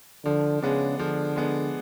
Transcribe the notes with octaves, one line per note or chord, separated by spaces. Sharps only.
D3 F3
C#3 G#3 B3 D4
D3 F3
G#3 B3 D4